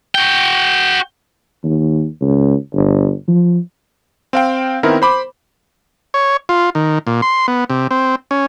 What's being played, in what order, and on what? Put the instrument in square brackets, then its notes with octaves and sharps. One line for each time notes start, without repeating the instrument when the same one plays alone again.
[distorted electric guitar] F#4 G5
[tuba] D#2
C#2
G1
F3
[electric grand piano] C4 F5 G5
D#3 B3 C4 E4 A#4
C5 B5 D6
[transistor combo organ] C#5
F4
D#3
A#2
C6
B3
C3
C4
C#4